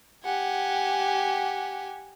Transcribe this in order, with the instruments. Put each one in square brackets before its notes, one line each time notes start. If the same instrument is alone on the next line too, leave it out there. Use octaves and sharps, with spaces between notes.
[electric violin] G4 G#5 [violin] F#5